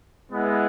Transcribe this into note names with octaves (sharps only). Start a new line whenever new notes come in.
G#3 B3 E4